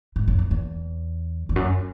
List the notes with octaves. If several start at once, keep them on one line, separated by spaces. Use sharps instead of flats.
G#2
F#2
F#2
E2
E2
F#2